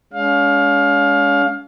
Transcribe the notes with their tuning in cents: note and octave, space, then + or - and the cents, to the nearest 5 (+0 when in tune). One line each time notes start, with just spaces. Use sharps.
G#3 +0 C#4 +40 F5 +20